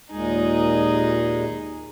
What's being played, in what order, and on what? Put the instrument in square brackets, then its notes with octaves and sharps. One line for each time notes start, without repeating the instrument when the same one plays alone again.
[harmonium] D#2 A#2 G#3 [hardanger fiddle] D#4 G#4